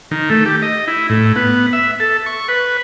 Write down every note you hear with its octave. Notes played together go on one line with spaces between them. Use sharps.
D#3
A3
G4
D#5
E4
A2
B3
E5
A4
C#6
B4